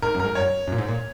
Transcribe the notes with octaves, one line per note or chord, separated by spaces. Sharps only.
G#2 A#4
F#2
G#2 A#4
F#2 C#5
F#2
A#2
G#2
A#2